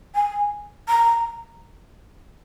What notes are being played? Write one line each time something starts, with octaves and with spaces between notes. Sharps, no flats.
G#5
A#5